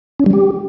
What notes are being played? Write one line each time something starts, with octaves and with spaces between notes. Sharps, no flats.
C#4
G3
G4